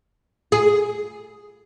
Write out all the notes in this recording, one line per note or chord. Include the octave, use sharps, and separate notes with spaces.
G#4